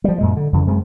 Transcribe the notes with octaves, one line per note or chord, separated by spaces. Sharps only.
F3 G3
F#2 A#2 G#3
D3
F2 C#3 E3
F#2 G#3 C4